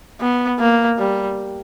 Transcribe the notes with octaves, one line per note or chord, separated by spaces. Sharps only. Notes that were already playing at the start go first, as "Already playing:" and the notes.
B3
A#3
G3